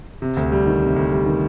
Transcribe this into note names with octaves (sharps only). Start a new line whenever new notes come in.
C3
D2
G3
D#3
C3
D2
G3
D#3